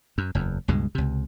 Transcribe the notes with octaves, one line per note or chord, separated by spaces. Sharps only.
F#2
F#1 E2
C#2 G2 B2 G#3
C#2 C3